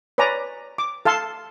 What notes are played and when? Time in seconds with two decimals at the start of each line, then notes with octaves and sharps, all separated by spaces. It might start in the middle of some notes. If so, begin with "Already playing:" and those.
0.18 B4 C#5 D5 G#5 A#5
0.78 D6
1.05 A4 F5 A5 C6